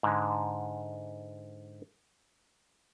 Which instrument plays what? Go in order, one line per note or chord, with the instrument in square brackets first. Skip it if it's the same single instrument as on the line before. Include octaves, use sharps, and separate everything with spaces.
[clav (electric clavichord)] G#2 D3 G#3